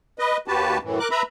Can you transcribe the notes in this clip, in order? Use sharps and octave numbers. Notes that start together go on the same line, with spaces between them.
B4 D#5
D#2 F#4 G4 B4 A5
F#2 A2 E3
A#4 D6 F#6
B4 E5 A#5 B5